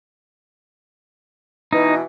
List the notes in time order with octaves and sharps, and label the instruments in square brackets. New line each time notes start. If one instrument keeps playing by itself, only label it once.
[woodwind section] B2 E3 [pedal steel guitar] D#4